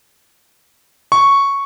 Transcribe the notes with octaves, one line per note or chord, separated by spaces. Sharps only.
C#6